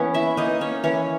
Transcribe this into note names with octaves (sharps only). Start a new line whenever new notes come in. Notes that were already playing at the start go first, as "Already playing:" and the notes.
Already playing: E3 A#3 B3 C#4 B4 C#5
E4 E5
A#3 D#4 D#5
C#4 C#5
E3 C#4 C#5